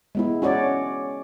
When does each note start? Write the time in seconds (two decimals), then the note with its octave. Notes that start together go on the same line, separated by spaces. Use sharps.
0.15 G#3 B3 E4
0.42 C#4 F#4 C#5 D5